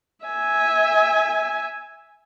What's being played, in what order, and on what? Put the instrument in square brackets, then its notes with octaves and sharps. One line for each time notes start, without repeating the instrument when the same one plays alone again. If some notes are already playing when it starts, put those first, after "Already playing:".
[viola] E5 G#5